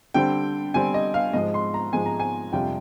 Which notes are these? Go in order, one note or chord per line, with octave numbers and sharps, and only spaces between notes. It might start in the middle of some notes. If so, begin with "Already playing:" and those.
D3 G3 C4 G5
D3 G3 C4 G#5
D#5
F5
G#2 F3 G#3 D#5
C6
A#5
G#2 F3 G#3 G#5
A#5
G#5
F2 C3 G3 D4 F4 G5